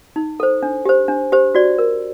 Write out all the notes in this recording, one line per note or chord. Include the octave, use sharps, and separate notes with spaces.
D#4
A4 C5
D4
G4 C5
D4
G4 C5
F#4 D5
A#4